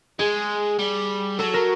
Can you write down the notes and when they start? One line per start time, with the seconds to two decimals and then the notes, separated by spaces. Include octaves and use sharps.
0.19 G#3 G#4
0.79 G3
1.38 F#3 A4
1.54 A#4